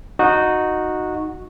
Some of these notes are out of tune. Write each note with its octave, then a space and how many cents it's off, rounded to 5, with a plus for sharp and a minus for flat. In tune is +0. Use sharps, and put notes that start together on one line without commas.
D#4 -5 F#4 -10